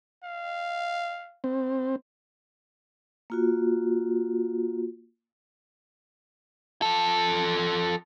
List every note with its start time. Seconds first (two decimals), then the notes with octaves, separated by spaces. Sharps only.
0.24 F5
1.44 C4
3.30 A#3 F4 F#4
6.82 F3 A4